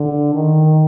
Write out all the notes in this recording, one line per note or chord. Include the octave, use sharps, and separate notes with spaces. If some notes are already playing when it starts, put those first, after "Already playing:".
Already playing: D3
D#3